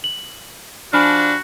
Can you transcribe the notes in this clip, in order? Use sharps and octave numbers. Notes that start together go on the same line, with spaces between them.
F#7
F3 D4 F#4 G#5 B5 F6